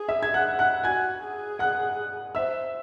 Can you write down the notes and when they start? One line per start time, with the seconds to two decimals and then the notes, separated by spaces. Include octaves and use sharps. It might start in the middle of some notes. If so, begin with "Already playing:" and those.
Already playing: G#4
0.08 E5 E6
0.23 G#6
0.34 F#5 F#6
0.59 F#5 F#6
0.83 F#4 G#5 G#6
1.22 G#4
1.59 F#5 F#6
2.35 C5 E5 E6